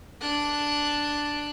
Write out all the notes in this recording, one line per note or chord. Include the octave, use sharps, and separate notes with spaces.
D4 F#6